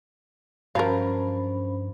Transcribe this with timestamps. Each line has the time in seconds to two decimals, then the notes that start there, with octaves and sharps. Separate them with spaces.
0.75 G2 F3 F#3 C#4 A#4 C5 F5 B5